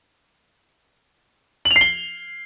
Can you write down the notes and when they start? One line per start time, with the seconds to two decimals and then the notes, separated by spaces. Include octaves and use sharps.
1.65 F#7
1.71 F7
1.76 C7
1.81 G7